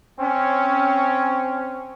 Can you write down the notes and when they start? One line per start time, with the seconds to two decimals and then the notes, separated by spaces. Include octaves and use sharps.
0.19 C4 C#4